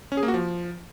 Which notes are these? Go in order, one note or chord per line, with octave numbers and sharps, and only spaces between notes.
C#4
G#4
A#3
F#4
F3